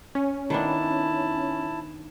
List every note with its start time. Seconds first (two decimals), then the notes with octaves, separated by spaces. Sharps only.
0.15 C#4
0.50 D#3 B3 D4 E4 A5